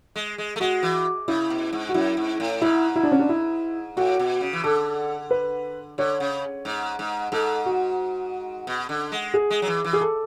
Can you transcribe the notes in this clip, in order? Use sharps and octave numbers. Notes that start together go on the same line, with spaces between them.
G#3
G#3
A3
G#3 F#4
E3
C#3 E4
B2
G#2
F#4
F#2 E4
G#2
A2
G#2 E4
E4
D4
C#4
D4
E4
A2 F#4
B2
C#3
E3
D3 A4
B4
D3 C#5
C#3
G#2
G#2
G#2 A4
F#4
B2
D3
G#3
G#4
G#3
F#3
E3
E3
G#4
A4